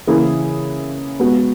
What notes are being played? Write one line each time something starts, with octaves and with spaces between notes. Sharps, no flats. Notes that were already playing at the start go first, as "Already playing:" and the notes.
C#3 E3 A#3 E4 G#4
G#3 B3 F#4